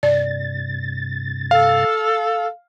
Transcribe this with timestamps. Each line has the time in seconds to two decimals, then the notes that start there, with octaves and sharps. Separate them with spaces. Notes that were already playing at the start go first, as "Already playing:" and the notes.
0.03 G2 C3 D5 A6
1.51 A4 F5